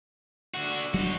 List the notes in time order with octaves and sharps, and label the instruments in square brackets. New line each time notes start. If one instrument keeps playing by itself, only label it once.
[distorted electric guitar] D3 F#4
[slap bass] F#3 G3 D4 [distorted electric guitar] D#4 F#4